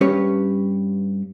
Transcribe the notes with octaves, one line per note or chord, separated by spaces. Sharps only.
G2 C#4 G4 B4 C#5